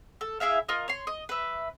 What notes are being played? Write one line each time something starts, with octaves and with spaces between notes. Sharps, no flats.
A4
E4 G#4 E5 F5
F4 A#4 D#5
C#5 C6
D#5
B4 E5